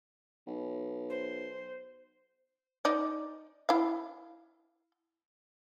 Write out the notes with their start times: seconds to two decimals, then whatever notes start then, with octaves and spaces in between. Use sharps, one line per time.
0.47 B1
1.09 C5
2.85 D#4 D5
3.69 E4 F5